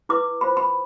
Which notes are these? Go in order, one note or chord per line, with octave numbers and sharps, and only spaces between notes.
E4 B4 D6
F4 C5 B5
B5